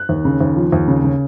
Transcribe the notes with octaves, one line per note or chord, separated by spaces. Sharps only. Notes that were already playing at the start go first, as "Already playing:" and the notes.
Already playing: F#6
D#2
C#3
D#2
F3
D#2
C#3
C#3